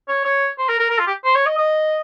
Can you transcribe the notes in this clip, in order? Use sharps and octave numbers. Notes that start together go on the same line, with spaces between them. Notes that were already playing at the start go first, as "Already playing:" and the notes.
C#5
C#5
C5
A#4
A#4
A#4
F4
G4
C5
C#5
D#5
D#5